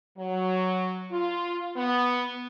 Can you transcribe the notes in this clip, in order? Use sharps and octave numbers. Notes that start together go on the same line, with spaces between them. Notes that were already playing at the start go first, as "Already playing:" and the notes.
F#3
F4
B3